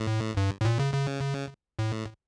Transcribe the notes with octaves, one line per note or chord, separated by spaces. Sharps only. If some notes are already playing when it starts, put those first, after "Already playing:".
Already playing: A2
G2
A2
A#2
C#3
C#3
A2